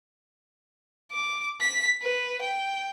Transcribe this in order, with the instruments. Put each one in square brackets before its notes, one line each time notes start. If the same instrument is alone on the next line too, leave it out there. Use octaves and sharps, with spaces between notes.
[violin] D6
B6
B4
G5